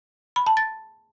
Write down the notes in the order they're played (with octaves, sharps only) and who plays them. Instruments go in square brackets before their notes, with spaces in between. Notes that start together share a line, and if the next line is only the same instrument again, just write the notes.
[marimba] B5
A5
A6